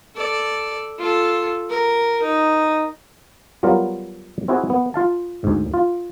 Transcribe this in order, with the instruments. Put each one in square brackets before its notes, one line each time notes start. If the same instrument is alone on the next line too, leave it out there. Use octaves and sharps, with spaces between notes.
[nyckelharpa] A4 D5
F4 A4
A#4
D#4
[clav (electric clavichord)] F#3 G3 B3 F4 A#4
C4 E4 F#4 G#4
B3
F4 F5 A5
D2 G#2
F4